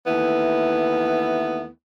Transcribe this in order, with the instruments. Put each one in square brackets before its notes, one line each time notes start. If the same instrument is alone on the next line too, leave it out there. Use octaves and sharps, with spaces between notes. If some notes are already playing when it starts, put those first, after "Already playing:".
[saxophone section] D#2 E3 A3 B3 E4